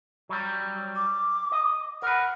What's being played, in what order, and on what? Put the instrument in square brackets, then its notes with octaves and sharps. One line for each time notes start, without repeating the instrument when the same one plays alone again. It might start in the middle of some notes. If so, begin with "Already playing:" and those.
[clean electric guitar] F#3 G3
[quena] D6
[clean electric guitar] D#5
[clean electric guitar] A#4 B4 [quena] F#5